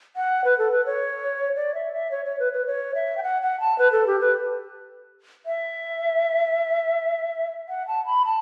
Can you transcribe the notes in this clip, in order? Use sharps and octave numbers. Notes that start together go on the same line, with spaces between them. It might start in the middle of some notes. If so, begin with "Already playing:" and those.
F#5
B4
A4
B4
C#5
D5
E5
E5
C#5
C#5
B4
B4
C#5
E5
G5
F#5
F#5
A5
B4
A4
G4
B4
E5
F#5
A5
B5
A5